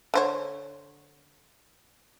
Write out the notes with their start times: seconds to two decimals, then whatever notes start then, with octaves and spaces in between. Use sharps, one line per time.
0.14 D3 C5 C#5